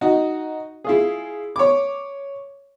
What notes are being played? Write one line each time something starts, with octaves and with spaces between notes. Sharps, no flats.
D#4 F#4
E4 F4 G#4
C#5 D6